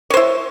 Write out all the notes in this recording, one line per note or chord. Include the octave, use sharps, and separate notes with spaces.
E4 C5 C#5